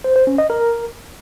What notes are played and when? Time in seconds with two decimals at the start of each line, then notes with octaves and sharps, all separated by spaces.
0.04 C5
0.16 C5
0.27 C#4
0.38 D#5
0.50 A#4